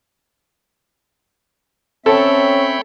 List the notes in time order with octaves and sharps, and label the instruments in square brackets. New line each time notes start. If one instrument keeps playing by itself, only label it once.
[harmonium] C4 E5 [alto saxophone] C#4 [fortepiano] A4 [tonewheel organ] C#5 G5 B5